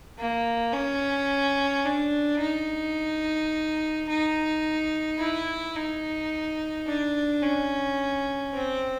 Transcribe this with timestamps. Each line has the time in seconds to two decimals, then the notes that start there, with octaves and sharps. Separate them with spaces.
0.18 A#3
0.73 C#4
1.85 D4
2.40 D#4
4.09 D#4
5.19 E4
5.76 D#4
6.87 D4
7.42 C#4
8.54 C4